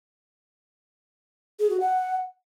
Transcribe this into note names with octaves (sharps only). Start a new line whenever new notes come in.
G#4
F#4
F#5